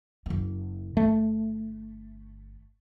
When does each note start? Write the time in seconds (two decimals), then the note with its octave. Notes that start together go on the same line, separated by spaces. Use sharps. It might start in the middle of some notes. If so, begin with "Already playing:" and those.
0.26 F#1 A#3
0.97 G1 A3